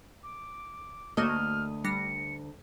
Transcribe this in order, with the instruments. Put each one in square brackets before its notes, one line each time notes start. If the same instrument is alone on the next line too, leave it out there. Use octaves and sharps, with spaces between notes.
[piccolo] D6
[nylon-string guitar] D2 D#5 [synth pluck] A3 A#3 F#4 [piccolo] F6
[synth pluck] G3 D4 A#6 [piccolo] C#7